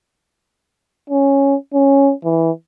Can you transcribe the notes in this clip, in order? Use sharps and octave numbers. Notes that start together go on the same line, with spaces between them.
C#4
C#4
E3